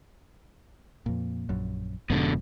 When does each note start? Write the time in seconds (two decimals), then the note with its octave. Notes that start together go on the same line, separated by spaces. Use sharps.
1.06 F2 A#2
1.49 A#1 F#2
2.10 F1 F2 G#2 B2 D3